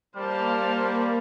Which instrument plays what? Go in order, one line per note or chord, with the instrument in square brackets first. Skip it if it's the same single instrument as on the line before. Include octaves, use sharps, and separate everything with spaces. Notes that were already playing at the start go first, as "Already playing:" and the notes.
[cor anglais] G3 [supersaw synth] A#3 [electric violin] C5 A5 [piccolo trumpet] F6